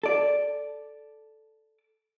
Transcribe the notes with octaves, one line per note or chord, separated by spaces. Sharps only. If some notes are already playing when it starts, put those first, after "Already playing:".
A4 D5